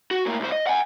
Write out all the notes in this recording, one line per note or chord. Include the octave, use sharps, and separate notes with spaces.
F#4
A2 A#3
C2 C5
D#5
F#5 G#5